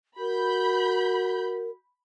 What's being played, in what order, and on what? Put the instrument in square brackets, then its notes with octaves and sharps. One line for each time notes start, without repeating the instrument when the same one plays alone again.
[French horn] F#4 [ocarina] A#4 [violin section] B5 G6